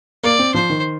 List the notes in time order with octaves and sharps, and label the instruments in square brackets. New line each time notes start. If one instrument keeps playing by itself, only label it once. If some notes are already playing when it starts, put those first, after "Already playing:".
[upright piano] A#3 [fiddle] D5
[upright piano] C4
[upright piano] F3 [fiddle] C5
[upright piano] D#3